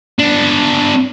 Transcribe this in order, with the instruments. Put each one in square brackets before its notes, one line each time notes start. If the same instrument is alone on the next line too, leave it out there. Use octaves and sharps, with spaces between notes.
[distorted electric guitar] B3 D4